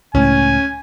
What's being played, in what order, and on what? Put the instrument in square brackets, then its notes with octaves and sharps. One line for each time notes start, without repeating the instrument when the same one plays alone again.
[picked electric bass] C#2 A2 [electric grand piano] C#4 [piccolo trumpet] G#5